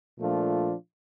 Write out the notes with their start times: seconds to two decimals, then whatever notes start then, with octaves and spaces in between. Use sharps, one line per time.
0.19 A#2 F3 A3 D4 F4